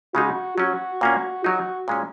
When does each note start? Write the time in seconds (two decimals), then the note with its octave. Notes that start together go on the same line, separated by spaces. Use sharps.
0.14 C#3 G#3 D#4 F#4
0.58 F#3 C#4 F#4
1.01 A#2 A#3 C#4
1.44 F#3 D#4 F#4
1.88 A#2 G#3 C#4